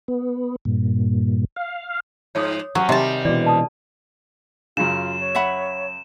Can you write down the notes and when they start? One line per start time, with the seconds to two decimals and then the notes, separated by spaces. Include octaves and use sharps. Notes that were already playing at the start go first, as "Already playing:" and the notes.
0.08 B3
0.65 G2 A#2
1.56 F5
2.35 G#2 F3 C#5 D6 D#6
2.75 F#3 C4 C#4 G4 F#5
2.89 C3 D#3 G3 C4 A5
3.25 B2 E3 F#4 G#4 D5
3.44 B4 A5 D#6
4.77 F#2 C#3 F4 E7
5.20 C#5
5.35 E5 F#5 B5